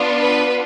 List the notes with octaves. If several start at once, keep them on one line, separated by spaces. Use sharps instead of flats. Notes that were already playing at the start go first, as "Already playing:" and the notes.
Already playing: B3 D4 F4
B4